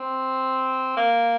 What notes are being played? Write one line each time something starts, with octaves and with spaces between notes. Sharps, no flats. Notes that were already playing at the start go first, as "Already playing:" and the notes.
Already playing: C4
A#3